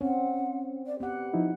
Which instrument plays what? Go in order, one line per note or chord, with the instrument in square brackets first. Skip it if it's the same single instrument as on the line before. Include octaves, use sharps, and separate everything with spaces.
[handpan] C4 [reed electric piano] C#4 [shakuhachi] F#5
[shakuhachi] D5
[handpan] B3 F#5 [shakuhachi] G4
[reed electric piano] F3 D#4 E4